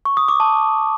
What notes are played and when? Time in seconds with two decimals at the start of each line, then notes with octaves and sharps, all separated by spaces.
0.05 C#6
0.17 D#6
0.28 D6
0.40 A5